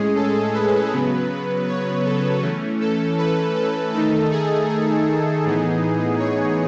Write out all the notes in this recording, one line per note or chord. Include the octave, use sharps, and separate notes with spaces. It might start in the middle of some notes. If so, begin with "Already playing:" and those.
Already playing: A2 G#3 C#4 G#4
A4
B4
C#3 F#3 B3
C#5
A4
E3 A3 C#4
A4
B4
A4
D#3 A3 D#4 A4
G#4
G#4
A2 E3 B3 D#4
C#5